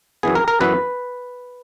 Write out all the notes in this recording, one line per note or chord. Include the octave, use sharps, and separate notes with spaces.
F#2 E3 B3 G#4
A#4
A#4
F#2 E3 B3 B4